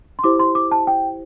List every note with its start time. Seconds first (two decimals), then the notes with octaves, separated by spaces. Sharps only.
0.19 C6
0.24 E4 G4 C5 D6
0.40 C6
0.55 D6
0.71 A5
0.87 G5